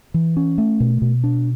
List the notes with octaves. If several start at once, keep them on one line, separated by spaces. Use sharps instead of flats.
E3
C#4
A3
B2
B2
D4